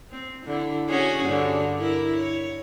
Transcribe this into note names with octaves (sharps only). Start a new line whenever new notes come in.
C4
D3 E4
C#4 F#4 G#4
G2 D3
E4 A#4
C#5